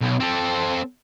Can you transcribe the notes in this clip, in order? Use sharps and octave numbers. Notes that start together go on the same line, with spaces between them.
B1
C4 A4